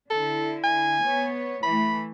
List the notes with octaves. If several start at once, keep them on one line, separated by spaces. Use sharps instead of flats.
D3 E4 A4
G#5
B3 C#5
E3 A3 B5